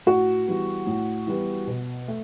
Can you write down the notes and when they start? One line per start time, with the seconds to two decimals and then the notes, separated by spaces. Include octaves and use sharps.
0.06 A2 F#4
0.47 E3 G3 B3
0.87 A2
1.27 E3 G3 B3
1.67 B2
2.08 A3